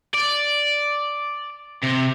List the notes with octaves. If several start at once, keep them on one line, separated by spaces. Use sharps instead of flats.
D5
C3